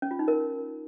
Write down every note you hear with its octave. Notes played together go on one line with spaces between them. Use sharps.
C#4
F4
D#4
A#4